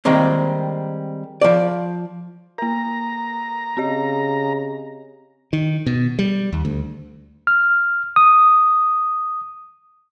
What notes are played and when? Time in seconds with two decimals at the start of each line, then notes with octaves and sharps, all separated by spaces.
0.05 D#3 G3 G#3 A#3 C4
1.41 F3 D5
2.58 A#3 A#4 A#5
3.77 C#3 C4 G4 D#5
5.53 D#3
5.86 B2
6.19 G3
6.53 D#2
6.65 D2
7.47 F6
8.16 D#6